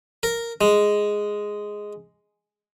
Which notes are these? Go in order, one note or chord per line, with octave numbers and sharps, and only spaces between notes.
A#4
G#3